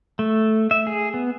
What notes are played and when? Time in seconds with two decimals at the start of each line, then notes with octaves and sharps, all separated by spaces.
0.19 A3
0.71 E5
0.87 G#4
1.14 B3